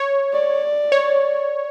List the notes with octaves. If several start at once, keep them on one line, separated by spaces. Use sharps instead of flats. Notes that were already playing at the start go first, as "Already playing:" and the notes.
Already playing: C#5
D5
C#5